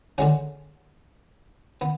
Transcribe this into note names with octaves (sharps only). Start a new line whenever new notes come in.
D3 G#3 C#4 F#5
B3